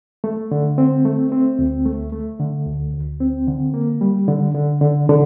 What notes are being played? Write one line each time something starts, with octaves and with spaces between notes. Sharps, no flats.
A3
D3
C4
A3
C4
D2
A3
A3
D3
D2
D2
C4
D3
A#3
G3
D3
D3
D3
D3